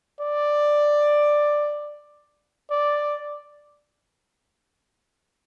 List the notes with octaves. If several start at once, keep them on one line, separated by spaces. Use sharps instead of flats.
D5
D5